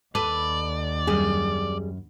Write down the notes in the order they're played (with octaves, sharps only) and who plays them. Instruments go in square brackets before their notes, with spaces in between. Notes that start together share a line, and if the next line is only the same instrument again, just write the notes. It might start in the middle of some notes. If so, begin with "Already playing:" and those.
[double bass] D#2 [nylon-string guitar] A4 [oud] B4 [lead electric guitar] D5
[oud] F#2 [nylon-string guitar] G3 G#4